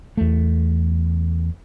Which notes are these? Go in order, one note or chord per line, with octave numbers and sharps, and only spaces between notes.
E2 A3